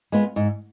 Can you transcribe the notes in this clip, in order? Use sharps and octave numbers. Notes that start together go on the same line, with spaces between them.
G#3 B3 F4
G#2